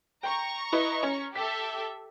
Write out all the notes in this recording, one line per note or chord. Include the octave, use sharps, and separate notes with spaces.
G5 A#5 C#6
E4 B4 D#5
C#4
G4 A4 E5 B6